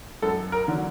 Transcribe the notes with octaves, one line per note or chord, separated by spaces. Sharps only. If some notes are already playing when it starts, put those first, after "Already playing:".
F#2 A4
A#4
D3 F#3